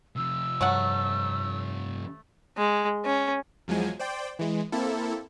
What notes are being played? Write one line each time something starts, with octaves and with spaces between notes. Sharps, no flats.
C3 F3 E6
G2 F#3 A3 F#5
G#3
C#4
E2 F3 F#3 G#3 G#5
C5 D5 G5
E3 G#3
A#3 C4 E4 A4